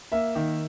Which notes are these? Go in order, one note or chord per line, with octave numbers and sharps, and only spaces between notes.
A#3 E5
D#3